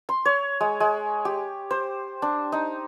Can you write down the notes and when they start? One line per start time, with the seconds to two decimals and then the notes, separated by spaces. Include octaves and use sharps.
0.09 C6
0.25 C#5
0.60 G#3
0.80 G#3
1.25 G4
1.71 C5
2.22 D4
2.52 D#4